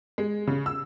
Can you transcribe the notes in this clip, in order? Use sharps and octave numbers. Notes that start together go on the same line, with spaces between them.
G#3
C#3
E6